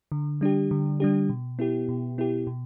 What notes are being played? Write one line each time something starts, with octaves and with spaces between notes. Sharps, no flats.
D3
G3 D4 G4
D3
G3 D4 G4
B2
B3 E4 G4
B2
B3 E4 G4
B2